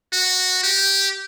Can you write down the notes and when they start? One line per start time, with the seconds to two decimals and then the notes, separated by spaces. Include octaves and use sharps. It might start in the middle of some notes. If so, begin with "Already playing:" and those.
0.13 F#4
0.63 G4